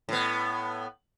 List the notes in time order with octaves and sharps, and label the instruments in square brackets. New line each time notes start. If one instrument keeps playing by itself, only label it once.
[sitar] A2 B3